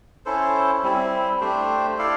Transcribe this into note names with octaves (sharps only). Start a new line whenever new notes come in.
C#4 E4 A4 C5
G3 C4 E4
A3 D4 G4 C5
E4 A4 D5 F5